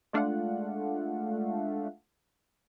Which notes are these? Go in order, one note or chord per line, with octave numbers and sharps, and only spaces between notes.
G#3 A3 D4 F4 F5 F#5